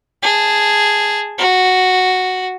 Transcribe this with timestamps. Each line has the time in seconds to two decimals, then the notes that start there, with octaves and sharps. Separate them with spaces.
0.23 G#4 A5
1.39 F#4